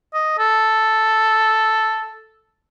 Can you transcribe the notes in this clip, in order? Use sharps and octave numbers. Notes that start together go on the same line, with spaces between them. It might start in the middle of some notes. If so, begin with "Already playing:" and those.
D#5
A4